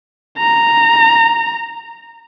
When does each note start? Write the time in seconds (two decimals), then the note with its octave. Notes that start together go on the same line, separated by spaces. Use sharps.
0.38 A#5